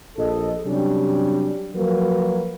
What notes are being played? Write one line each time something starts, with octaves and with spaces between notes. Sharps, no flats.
A#1 A4 D#5
C3 F#3 G3 C#4 D4 G4
F3 F#3 A#3 F#4 A#4 B4